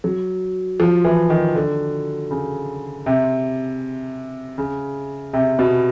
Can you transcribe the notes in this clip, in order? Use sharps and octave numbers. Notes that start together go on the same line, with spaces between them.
F#3
F3
E3
D#3
D3
C#3
C3
C#3
C3
B2